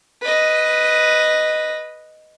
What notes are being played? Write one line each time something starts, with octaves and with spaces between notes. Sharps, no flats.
B4 D#5